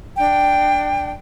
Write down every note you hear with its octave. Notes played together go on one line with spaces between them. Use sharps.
D4 G5